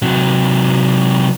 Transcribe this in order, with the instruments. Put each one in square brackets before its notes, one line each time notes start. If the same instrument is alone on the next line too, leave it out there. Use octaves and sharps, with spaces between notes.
[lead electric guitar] C3 F#3